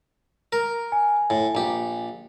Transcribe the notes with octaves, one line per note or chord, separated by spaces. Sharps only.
A#4
G#5
A2
A#1 G4